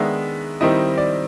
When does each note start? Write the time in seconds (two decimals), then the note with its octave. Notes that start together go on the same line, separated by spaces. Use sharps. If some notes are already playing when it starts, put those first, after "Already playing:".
Already playing: D#3 G#3 B3 D4 E5
0.61 D#3 G3 C4 E4 D#5
0.98 D5